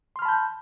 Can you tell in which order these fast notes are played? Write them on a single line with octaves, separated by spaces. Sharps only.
C6 F6 B5 A5 G6